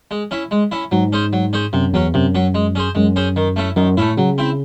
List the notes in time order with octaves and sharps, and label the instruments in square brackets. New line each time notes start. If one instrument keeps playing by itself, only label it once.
[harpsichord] G#3
C#4 E4
G#3
C#4 E4
[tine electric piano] G#2 [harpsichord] F#3
[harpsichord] C#4 G#4 C5
F#3
C#4 G#4 C5
[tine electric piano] F#2 [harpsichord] C3
[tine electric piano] E2 [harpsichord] F#3 C#4
[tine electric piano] F#2 [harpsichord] C3
[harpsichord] F#3 C#4
G#3
C#4 G#4 C5
[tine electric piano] F#2 [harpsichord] G#3
[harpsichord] C#4 G#4 C5
D#3
A3 C#4 E4
[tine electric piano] F#2 [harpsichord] D#3
[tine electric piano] A2 [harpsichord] A3 C#4 E4
[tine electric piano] C#3 [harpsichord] F#3
[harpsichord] C4 E4